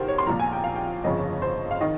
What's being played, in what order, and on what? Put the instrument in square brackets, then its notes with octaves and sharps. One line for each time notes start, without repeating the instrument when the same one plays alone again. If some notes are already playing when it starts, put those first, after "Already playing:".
Already playing: [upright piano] C2 C3 D#3 A#4 C5
C#5
C6
A#1 A#2 F3 A#5
G#5
G5
F5
G5
G1 F2 C#3 D#5
C5
F5
D#3 D#5